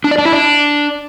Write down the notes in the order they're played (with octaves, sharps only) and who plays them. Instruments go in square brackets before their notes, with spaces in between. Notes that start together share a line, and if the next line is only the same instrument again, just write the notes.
[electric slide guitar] D4
D5
D4
E4
D4